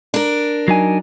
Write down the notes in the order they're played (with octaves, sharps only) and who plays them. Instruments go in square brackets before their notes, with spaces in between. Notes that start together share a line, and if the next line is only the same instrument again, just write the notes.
[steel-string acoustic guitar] D4 A#4
[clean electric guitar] F#3 D#4 G#5